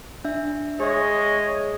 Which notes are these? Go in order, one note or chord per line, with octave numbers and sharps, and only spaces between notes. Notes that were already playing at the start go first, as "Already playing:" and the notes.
D4 E5
G#3 G#4 C#5 D#5 E5